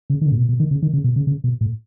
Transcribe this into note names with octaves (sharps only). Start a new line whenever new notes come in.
C#3
D#3
C#3
A2
B2
B2
D#3
C#3
D#3
C#3
B2
C#3
C#3
B2
A2